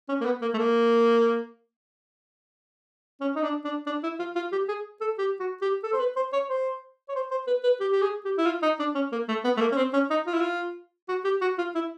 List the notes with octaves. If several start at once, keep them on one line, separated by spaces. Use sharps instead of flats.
C#4
A#3
B3
A#3
A3
A#3
C#4
D#4
D4
D4
D4
E4
F4
F4
G4
G#4
A4
G4
F#4
G4
A4
C5
B4
C5
C#5
C5
C#5
C5
C5
B4
B4
G4
G4
G#4
G4
E4
F4
D#4
D4
C#4
A#3
A3
B3
A3
A#3
C#4
C4
C#4
D#4
F4
E4
F4
F#4
G4
F#4
F4
E4